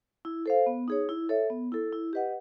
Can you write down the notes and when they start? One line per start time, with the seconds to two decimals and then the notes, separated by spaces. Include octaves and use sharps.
0.25 E4
0.46 A4 C5 F5
0.66 B3
0.88 D#4 G#4 C#5
1.09 E4
1.29 A4 C#5 E5
1.50 B3
1.72 E4 A4
1.92 E4
2.13 G4 B4 D#5 F#5